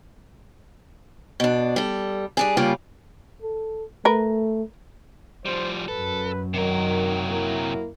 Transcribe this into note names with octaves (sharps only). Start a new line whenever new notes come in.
B2 D4
G3 A4
G3 D4 G#4
C#3 G3 A#3 F4
A4
A3 A#4 B4
F3 G3 C5
F#2 A4 B4
C3 D#3 F#3 A#4
A#3 E4